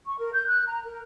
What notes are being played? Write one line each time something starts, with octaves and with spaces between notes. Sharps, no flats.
C#6
A#4
G6
F#6
A#5
A#4